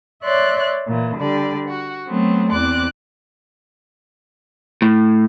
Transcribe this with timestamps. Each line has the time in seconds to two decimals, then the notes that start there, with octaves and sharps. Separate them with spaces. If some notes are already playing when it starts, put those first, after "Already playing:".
0.24 C#5 D5 E5 C6 F#6
0.87 A#2 E3
1.18 D3 G3 D5
1.67 F#4
2.07 F#3 A3 B3 C4
2.51 E2 C4 D5 D6 F#6
4.82 A2